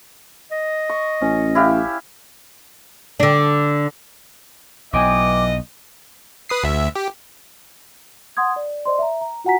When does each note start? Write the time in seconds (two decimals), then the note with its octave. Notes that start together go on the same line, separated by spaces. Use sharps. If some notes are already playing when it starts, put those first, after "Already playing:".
0.51 D#5
0.90 C#6
1.21 A1 C#4
1.55 E4 G4 F5
3.20 D3 D4
4.93 B1 E3 F#3 D#5 G5 G#5 D6
6.49 B4 D#6 C7
6.64 D2 E5
6.95 G4
8.37 F#5 C6 D#6 G#6
8.56 D5
8.85 C5 D5 D#5 C6
8.99 E5 A#5
9.21 A#5
9.44 F4 F#4 F#5 G#5 A#5 B6